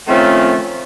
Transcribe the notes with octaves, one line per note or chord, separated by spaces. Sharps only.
D#3 F3 A3 C4 C#4